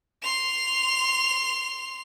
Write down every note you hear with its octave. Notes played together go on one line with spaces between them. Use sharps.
C6 F7